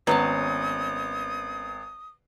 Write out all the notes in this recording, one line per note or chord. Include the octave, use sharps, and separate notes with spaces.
G#1 F#3 B3 C#4 A5 D#6